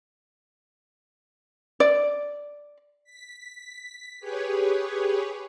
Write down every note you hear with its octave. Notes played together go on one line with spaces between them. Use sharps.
D5
B6
G4 G#4 B4 C#5